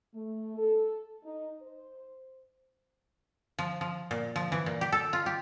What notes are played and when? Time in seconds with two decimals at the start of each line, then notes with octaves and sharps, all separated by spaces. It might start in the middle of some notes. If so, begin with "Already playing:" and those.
0.14 A3
0.58 A4
1.24 D#4
1.62 C5
3.59 F3
3.81 F3
4.11 A#2
4.36 F3
4.52 E3
4.66 A#2
4.81 G4
4.92 A4
5.13 F4
5.26 G4